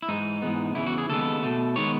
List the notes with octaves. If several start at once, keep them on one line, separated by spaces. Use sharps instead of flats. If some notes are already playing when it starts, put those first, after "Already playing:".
E4
G#2 E3 G#3 D#4
G#2 E3 G#3 B3
E2 C#3 E3 E4
F#4
G#4
D#2 C#3 G#3 B3 A4
B2 A3
D#3 G#3 B3 C#5